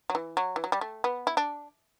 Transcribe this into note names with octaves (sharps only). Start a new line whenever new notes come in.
F#3
E3
F#3
E3
F#3
G3
A3
B3
E4
D4